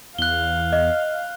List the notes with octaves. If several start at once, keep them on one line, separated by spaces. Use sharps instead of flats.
E2 F5 F#6 G7
D#5